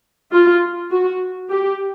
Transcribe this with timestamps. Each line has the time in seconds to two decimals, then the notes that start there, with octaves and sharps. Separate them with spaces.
0.32 F4
0.91 F#4
1.49 G4